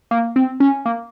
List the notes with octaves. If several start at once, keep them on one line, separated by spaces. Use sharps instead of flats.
A#3
C4
C#4
A#3